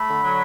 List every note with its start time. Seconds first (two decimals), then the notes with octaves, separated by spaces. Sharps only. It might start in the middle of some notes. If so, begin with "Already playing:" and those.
Already playing: A3 B5
0.09 D3
0.23 F#3